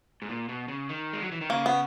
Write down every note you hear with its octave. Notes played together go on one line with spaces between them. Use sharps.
G#2
A#2
B2
C#3
D#3
G#3
F#3
E3
D#3
C#3 A#3
B3